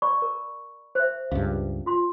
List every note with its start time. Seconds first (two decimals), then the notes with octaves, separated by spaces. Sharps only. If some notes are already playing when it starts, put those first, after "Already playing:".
0.02 D5 B5 C#6
0.22 A#4
0.95 C5 E5
1.31 C#2 G2 F5
1.86 F4 C6